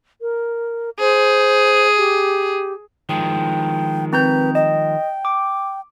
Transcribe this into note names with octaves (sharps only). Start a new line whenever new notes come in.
A#4
G#4 C5
G4
D#3 F3 G#3 G5
C4 B4 A#5 G6
D#5 G5
D6